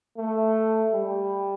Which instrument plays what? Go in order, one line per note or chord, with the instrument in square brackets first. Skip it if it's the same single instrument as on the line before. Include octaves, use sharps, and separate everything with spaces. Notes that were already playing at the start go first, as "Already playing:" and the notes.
[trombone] A3
G3